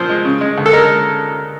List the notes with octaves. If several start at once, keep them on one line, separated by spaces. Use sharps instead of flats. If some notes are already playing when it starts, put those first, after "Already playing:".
Already playing: A#2 F3 C5
G#3
C#3
G#3
D2
A4
G#3 A#4